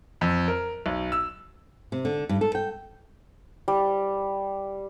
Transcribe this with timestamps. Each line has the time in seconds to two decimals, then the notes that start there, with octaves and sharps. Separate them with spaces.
0.21 F2
0.48 A#4
0.86 B1
1.12 E6
1.92 C3
2.05 D3
2.29 G2
2.41 A4
2.55 G5
3.68 G3